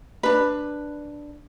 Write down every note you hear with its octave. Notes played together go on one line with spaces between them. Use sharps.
D4 B4